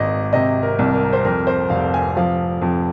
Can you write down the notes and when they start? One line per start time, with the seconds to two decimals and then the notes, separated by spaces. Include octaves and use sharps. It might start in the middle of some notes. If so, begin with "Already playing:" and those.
Already playing: G#1 G#2 D#5
0.33 C3 D#5
0.63 A#4
0.79 C2
0.94 A#4
1.13 C5
1.25 F2 A#4
1.47 C5
1.70 F1 F5
1.94 G#5
2.17 F3 F5
2.62 F2